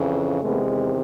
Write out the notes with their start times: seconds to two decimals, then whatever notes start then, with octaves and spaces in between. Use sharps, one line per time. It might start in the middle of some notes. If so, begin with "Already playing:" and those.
Already playing: F2 C#3 E3
0.42 E2 C3 D#3 G#3 A3 B3